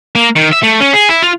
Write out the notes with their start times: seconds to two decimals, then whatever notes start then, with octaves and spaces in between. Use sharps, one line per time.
0.15 A#3
0.36 D#3
0.52 E5
0.63 A3
0.80 C#4
0.93 G#4
1.09 E4
1.23 F4